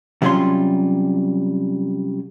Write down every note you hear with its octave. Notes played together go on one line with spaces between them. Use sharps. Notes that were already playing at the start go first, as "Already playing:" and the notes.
C3 F#3 G3 C#4 F4 C6